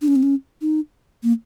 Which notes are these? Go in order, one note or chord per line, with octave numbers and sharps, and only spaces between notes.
D4
C#4
C4
C#4
D#4
A#3